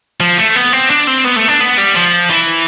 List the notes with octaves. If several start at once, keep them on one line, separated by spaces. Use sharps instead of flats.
F3
A3
B3
C4
D4
C4
B3
A3
D4
B3
G3
F3
E3